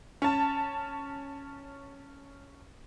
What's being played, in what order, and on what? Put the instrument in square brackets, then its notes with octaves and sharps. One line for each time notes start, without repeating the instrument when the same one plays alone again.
[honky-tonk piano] C#4 A5